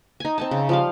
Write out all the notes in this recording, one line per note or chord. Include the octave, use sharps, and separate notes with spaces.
D#4 G#5
C4 D#4 A5
C#3
F3 G3 F5